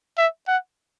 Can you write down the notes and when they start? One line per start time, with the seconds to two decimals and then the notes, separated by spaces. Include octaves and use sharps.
0.17 E5
0.48 F#5